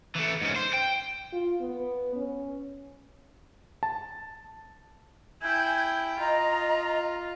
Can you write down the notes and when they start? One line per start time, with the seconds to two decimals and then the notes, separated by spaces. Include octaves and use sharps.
0.15 E3 A3
0.41 G#2 C#4
0.56 C5
0.73 G5
1.32 F4
1.61 B3
2.15 C#4
3.83 A5
5.42 E4 G5 G#5 G6 G#6
6.19 F4 D#5 A#5